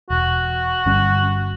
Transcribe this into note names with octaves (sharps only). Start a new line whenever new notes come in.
E1 F#4
G1 G3 C#4